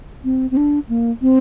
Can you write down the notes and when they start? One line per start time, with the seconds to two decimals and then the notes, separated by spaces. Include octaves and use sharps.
0.24 C4
0.51 C4
0.57 D4
0.89 A#3
1.22 C4